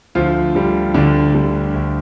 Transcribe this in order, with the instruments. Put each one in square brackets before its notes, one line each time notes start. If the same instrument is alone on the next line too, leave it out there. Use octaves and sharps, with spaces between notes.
[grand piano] D2 F3 F4
D3 G3
D2 D3 D4
D3 G3
D2